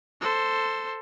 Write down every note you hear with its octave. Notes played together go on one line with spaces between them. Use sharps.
A4 C5